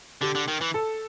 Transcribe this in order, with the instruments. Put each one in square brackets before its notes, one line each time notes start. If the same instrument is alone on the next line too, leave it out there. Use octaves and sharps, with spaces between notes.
[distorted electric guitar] D3 [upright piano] G4
[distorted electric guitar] D3
D#3
E3
[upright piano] A4